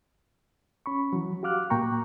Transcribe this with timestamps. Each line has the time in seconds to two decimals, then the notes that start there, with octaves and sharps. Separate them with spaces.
0.86 C#4 B5 C#6
1.13 E3 F#3
1.43 F#4 G4 F5 D6 F6 F#6
1.70 A#2 A#3 G5 A#5 C#6